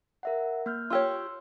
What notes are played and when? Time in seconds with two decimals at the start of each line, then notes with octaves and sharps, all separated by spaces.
0.23 A#4 E5 F#5
0.66 A#3 F6 G6
0.90 F4 G4 C#5 C6 E6